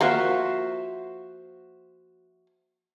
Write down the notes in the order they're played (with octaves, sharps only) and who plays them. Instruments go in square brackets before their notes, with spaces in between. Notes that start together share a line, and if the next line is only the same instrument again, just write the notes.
[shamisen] F3 A#3 F4 [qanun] F#4 C5 E5